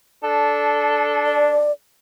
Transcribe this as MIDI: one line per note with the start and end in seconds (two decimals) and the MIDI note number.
0.24 1.71 62
0.24 1.75 69
1.26 1.72 74